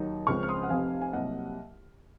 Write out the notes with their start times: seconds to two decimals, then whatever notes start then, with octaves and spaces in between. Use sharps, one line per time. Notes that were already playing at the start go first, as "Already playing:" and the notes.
Already playing: D#2 F#3 D#4
0.27 C#2 C#3 F3 C4 C#6 F6
0.43 F6
0.49 C6 D#6
0.63 F#5
0.69 F1 F2 C3 F5 G#5
1.01 G#5
1.12 C2 C3 F#3 A#3 D#5 F#5